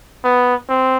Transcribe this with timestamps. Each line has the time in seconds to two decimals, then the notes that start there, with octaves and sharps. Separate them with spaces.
0.24 B3
0.69 C4